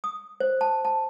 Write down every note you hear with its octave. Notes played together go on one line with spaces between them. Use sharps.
D#6
C5
A5
A5